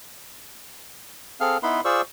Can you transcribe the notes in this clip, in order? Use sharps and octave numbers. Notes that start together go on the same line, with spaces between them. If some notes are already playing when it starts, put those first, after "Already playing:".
C4 G#4 A4 F5 F6
B3 D#4 E4 B4 B5 C6
F4 G#4 C5 D5 C#6 E6